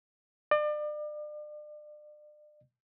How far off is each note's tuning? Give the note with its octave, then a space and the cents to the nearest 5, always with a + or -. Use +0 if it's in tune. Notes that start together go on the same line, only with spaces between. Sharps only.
D5 +35